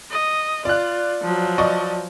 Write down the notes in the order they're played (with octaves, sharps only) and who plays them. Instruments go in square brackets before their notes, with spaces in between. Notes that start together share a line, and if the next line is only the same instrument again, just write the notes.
[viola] D#5
[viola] F4 [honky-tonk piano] D5 F#6
[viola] F3 F#3
[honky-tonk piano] D5 D#5 C#6